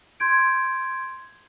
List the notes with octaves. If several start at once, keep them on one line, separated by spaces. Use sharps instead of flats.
C6 G6 G#6 D7